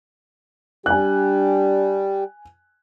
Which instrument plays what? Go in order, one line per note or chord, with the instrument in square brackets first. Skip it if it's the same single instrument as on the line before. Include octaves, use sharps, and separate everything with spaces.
[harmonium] G3 [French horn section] D4 G4 [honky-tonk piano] G#5 F#6